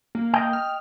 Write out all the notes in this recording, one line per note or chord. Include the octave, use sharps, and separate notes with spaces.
A#3
D#5 G5
F6